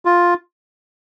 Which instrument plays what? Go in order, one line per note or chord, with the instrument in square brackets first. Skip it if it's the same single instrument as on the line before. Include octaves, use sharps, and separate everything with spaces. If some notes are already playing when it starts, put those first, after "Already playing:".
[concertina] F4